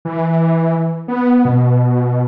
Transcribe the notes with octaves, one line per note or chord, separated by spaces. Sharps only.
E3
B3
B2